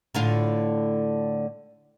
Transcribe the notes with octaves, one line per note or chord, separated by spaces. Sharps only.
A2 D3 F4